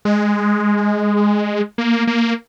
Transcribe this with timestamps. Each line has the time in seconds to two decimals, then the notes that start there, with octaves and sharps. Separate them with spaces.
0.05 G#3
1.78 A#3
2.07 A#3